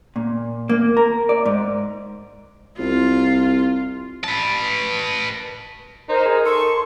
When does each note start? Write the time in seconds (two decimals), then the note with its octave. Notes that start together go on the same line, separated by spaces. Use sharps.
0.16 A#2
0.69 A#3
0.97 A#4
1.29 D5
1.46 G#2
2.79 C2 F4
4.24 B4 A5
6.09 D#4 A#4 C5
6.26 G#4
6.45 A4 C6 C#6